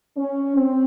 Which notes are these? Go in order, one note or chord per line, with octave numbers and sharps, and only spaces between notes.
C#4
C4